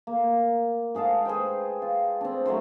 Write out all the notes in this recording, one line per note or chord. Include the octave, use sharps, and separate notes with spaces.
A#3
G#2 G#4 F5 A5
G#4 B4 C5 G5
F4
C4 D4
F#3 A3 A#4 C5